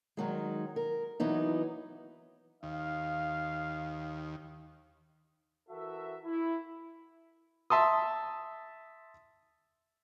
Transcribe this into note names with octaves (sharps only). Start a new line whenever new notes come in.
D#3 F#3 G#3
A#4
E3 F#3 B3 D#4
D#2 F5
E3 F#4 A4 A#4 E5
E4
E5 A5 C6 D#6